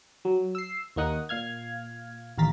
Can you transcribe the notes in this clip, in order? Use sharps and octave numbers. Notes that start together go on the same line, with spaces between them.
F#3
E6 C7
D#2 A#3 D#4 F#5 D#6
A#2 F5 F6 G#6
A1 D#2 F5 A#5 A6 B6